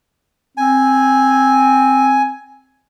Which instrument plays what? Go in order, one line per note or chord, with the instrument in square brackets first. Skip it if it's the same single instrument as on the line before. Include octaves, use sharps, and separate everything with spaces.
[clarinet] C4 [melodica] G#5